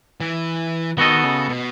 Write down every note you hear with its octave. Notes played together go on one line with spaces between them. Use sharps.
E3
D#3 B3 F#4 A4 D#5
C#3
B2